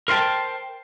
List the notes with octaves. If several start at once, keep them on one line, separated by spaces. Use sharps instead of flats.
A#4 C5 D#5 G5 A5